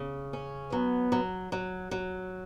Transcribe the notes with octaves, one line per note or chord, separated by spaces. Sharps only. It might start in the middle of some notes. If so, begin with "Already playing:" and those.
Already playing: C#3
C#4
F#3 B3
F#3
F#3
F#3